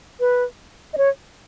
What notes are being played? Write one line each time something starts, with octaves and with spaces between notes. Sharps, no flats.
B4
D#5
C#5